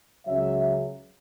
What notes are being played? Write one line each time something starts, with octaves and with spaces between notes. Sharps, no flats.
C#2 C#3 F#3 C#4 E5